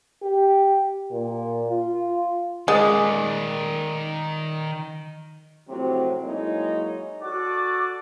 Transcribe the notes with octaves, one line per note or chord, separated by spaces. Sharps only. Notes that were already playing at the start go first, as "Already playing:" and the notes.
G4
A#2
F4
D#3 G#3 D5
A2 C3 F3 F#3 C4
F#3 G#3 A#3 D#4 E4 C#5
F#4 A4 D5 D6